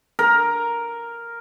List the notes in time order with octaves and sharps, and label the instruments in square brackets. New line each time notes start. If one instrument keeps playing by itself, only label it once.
[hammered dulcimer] A#4